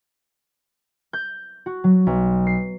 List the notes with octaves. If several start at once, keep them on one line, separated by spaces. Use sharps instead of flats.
G6
F#4
F#3
B1
C7